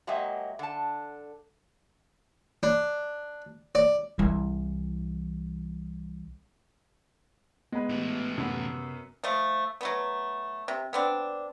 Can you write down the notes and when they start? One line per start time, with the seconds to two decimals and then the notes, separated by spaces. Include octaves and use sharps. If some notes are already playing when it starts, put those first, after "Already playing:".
0.07 F#3 G#3 A#3 G4 D#5 E5
0.59 D3 A5
2.63 D4
3.75 D5
4.18 C2 E3
7.73 G#3 B3 B4
7.90 A2 E3
8.38 F#2 C3 B3
9.24 F3 A3
9.81 F#3 A3 B3
10.68 C3
10.93 B3 C4 D4